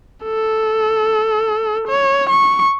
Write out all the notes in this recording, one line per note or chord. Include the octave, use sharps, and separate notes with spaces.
A4
C#5
C#6